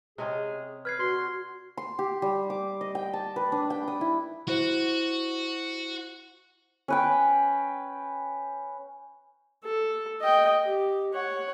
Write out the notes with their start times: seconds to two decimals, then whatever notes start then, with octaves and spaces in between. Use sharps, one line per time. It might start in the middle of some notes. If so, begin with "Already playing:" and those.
0.18 C3 G#3 C#4 G#4
0.85 B4 F6 G#6 C7
0.99 F#4 D5 C6
1.77 C6
1.99 G4
2.22 G3
2.50 D6
2.81 D#5
2.95 G5
3.13 A5
3.36 B4
3.52 D4
3.70 G5
3.88 D#6
4.01 E4
4.48 E4 F#4 C5
6.88 C#4 B4 G5
9.64 A4
10.21 D#5 G5
10.64 G4
11.14 C#5 F#5